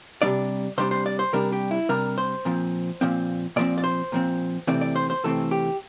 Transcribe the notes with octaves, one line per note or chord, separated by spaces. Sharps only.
C3 G3 D4 D5
C3 G3 D4 C5
C5
D5
C5
C3 G3 D4 A#4
G4
E4
C3 G3 D4 A#4
C5
A#2 F3 C4
A#2 F3 C4
A#2 F3 C4 D5
D5
C5
A#2 F3 C4
C3 E3 A3 C4 D5
D5
C5
C5
C3 E3 A3 C4 A4
G4